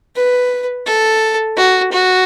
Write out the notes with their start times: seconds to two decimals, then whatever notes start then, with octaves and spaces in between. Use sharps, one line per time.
0.16 B4
0.86 A4
1.57 F#4
1.92 F#4